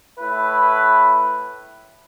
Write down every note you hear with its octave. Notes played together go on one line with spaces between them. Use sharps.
A2 E4 B4